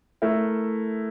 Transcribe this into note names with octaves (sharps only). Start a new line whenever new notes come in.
A3 E4 A#4